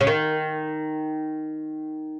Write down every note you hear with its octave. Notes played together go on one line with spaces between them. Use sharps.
C#3
D#3